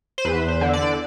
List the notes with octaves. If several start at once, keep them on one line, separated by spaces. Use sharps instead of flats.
C5
E2 B4
C5
D3
D5